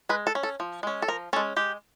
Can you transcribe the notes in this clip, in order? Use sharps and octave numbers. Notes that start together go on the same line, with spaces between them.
G#3 B4
A4
C#4
A4
F3
G#3 C#4
A4
F3 A#4
G#3 C#4 A4
G#3 G4